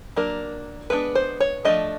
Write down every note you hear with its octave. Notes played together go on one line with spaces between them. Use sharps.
F#3 A#3 D4 A#4
G#3 B3 D4 B4
C5
C#5
F3 A3 D4 D#5